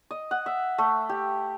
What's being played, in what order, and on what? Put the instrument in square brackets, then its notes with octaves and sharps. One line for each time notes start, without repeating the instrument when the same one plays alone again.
[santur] D#5
F#5
E5
A3
G4